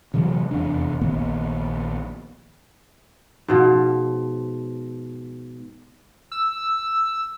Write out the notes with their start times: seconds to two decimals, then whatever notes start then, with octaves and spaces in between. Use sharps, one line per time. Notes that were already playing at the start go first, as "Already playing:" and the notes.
0.14 C3 E3 F#3 G#3
0.51 F1 E2 C3 D4
1.01 A#1 D#3 A#3 B3
3.48 G#2 B2 F3
6.32 E6